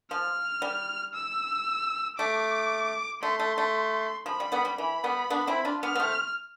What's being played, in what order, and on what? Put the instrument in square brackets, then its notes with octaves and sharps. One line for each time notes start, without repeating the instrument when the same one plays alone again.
[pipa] F3 [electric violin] F6
[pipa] G3
[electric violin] E6
[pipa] A3 [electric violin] D6
[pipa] A3 [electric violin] C6
[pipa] A3
A3
[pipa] F3 [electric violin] B5
[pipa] G3
G3 B3
G3
[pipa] E3 [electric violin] B5
[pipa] G3 B3
B3 D4
C4 E4
D4 F4
[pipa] B3 D4 [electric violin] F6
[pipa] B3
A3 C4